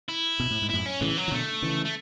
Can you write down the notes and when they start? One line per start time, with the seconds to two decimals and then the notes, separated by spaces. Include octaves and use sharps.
0.09 E4
0.40 B2
0.51 A2
0.62 G#2
0.70 F#2 A2 E4
0.86 C#4
1.01 A2 C#3 E3
1.17 F#3
1.28 E3
1.31 B2 D3 A3
1.62 C#3 E3
1.85 A3